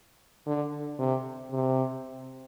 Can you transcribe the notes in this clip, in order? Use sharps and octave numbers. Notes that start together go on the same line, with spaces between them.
D3
C3
C3